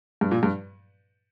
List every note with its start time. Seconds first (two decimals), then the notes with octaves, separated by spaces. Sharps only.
0.21 G2
0.31 A#2
0.43 G2